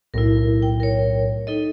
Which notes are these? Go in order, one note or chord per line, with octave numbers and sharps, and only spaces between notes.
B1 A2 E4 A#4
G5
A#4 C#5
D#4 A4 D#5